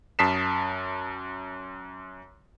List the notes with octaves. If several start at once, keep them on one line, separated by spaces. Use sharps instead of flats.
F#2 A5 D#6 B6 C7 E7